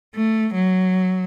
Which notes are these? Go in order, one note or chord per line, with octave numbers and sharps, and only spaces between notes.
A3
F#3